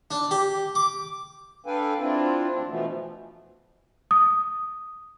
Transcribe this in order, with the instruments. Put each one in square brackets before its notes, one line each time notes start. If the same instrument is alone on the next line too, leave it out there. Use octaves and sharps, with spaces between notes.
[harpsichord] D4
G4
D6
[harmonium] D4 A4 B4 F5 G5 G#5
C4 D4 E4 F4
D2 D4
B2 E3 F3 A3 B3
[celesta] D#6